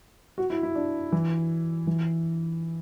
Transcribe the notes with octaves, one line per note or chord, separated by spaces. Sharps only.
F#4
E4
E4
D4
E3
E3